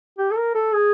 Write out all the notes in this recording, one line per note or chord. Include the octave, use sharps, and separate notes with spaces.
G4
A4
A#4
A4
G#4